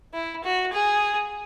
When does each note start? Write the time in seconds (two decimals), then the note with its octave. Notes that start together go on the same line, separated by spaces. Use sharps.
0.14 E4
0.44 F#4
0.73 G#4